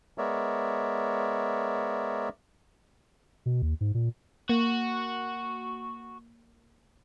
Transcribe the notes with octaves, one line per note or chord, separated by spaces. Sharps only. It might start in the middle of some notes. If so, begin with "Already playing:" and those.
G#3 B3 A#4 C#5 D5 E5
B2
D#2
G#2
A#2
A#3 F#4